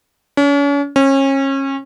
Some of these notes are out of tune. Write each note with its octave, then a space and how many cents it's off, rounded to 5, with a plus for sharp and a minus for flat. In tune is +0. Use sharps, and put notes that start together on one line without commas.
C#4 +40
C#4 -30